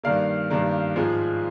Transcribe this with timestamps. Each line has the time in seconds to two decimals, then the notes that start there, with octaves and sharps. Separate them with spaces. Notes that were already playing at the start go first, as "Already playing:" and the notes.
0.03 G2 D#3 G3 A#3 D5 F5
0.50 G2 D#3 G3 A#3
0.96 G#2 F3 G#3